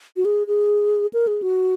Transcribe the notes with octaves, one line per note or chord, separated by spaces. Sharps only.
F#4
G#4
G#4
A#4
G#4
F#4